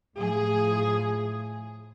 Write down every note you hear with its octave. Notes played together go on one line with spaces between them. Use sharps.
A2 F3 G#4